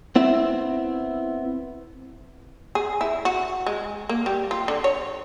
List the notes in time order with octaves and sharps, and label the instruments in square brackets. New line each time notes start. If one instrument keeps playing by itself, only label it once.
[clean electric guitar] B3 C4 E4 E5
[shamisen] G#4
E4
F#4
G#3
A#3
G3
F4
D3
C#5